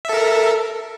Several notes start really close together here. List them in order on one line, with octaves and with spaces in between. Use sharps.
E5 A4 A#4